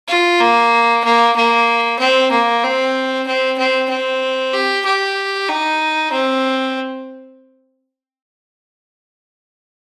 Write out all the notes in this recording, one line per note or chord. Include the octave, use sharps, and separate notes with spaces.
F4
A#3
A#3
A#3
C4
A#3
C4
C4
C4
C4
G4
G4
D#4
C4